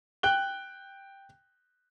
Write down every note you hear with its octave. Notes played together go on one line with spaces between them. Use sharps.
G5 F#6 G7